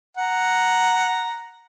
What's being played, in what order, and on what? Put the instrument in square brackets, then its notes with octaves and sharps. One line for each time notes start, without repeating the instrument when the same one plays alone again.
[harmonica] F#5 A#5